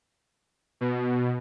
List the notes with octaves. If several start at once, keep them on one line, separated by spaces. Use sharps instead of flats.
B2